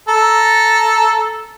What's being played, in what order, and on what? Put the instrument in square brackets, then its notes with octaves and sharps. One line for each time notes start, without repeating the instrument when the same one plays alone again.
[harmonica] A4 A#5